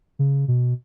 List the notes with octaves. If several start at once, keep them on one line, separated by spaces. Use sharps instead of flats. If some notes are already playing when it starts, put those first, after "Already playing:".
C#3
B2